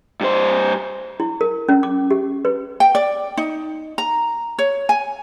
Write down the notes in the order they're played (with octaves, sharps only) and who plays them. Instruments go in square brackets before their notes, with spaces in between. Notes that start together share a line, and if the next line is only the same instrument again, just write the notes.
[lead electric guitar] G2 C5
[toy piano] E4
A#4
C#4
D6
G4
B4
[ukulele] G5
D5
D#4
A#5
C#5
G#5